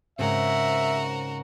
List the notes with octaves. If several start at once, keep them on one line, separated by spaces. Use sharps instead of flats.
G#2 C#3 C4 F#4 A#4 E5